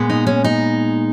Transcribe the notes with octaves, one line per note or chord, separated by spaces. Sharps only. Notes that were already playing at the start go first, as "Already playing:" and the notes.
Already playing: A#2 G#3 B3
D#4
C#4
D#4